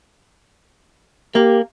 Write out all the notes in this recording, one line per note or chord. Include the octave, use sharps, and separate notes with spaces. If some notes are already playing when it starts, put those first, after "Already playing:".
A#3 G4